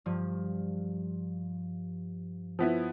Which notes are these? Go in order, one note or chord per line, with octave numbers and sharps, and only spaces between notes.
G2 F3
F3 B3 E4